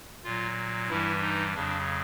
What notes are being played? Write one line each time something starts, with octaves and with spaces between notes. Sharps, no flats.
A#2 F#3 F4
G2 E3 G3 E4
D#4
F2 C#3 F#3 D4